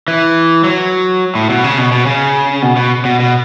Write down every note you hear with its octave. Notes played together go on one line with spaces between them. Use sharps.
E3
F#3
A2
B2
C#3
B2
B2
C#3
B2
B2
B2
B2